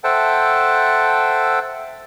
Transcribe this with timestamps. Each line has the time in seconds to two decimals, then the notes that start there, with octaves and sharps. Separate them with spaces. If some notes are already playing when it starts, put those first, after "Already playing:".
0.04 A4 C5 E5 F#5 G5 A5